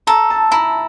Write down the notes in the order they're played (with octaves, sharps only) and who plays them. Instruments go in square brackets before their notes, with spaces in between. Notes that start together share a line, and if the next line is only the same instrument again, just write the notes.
[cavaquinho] A4 [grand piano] A#5
[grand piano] A5
[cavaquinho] E4 [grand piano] A#5